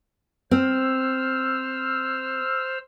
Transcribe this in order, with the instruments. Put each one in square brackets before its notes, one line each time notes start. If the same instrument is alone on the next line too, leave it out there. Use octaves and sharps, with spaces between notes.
[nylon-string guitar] C4 [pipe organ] C5 E6 F6